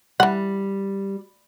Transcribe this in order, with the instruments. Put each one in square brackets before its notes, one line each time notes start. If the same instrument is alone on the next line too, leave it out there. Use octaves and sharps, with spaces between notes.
[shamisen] E3 F#5 [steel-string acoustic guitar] G3